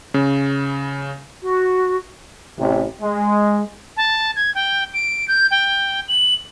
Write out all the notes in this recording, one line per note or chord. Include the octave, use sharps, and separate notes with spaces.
C#3
F#4
A1 C3
G#3
A5
G#6
G5
D7
G6
G5
F#7